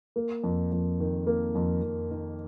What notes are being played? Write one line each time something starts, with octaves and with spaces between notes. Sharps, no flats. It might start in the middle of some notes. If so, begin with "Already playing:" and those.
A#3
F2
F2
D#3
A#3
F2
F2
D#3